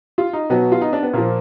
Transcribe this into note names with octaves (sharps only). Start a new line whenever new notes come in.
F4
D#4
B2 F#3 B3
F4
D#4
D4
B3
A#2 F3 A#3